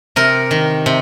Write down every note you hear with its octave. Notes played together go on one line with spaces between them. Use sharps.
C3 A#4
D#3
C3